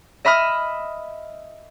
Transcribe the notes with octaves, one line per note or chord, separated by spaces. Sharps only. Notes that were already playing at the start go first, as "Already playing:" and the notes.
D#5 E5 B5 D#6 F6